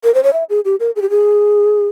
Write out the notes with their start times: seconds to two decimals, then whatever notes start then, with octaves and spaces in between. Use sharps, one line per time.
0.04 A#4
0.14 C5
0.23 C#5
0.33 E5
0.50 G#4
0.65 G4
0.80 A#4
0.96 G#4
1.02 G4
1.10 G#4